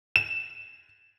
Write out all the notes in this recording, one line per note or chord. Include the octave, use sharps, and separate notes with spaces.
E7